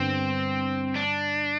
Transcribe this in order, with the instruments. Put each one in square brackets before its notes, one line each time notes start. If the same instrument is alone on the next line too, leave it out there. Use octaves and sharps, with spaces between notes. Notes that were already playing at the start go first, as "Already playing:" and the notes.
Already playing: [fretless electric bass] G2 D3 G3 B3 [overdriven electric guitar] C4
[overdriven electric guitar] D4